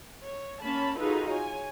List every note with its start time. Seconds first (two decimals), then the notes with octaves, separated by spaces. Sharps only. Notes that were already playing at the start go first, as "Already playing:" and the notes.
0.24 C#5
0.63 A#3 C#4 A5 B5
0.97 D#4 F4 F#4 G#4 A4 B4
1.31 C#5 G#5